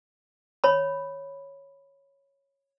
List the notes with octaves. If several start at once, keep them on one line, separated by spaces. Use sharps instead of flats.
C#5 B5